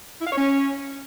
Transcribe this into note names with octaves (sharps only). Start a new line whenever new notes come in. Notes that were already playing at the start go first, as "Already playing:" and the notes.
E4
F5
C#5
C#4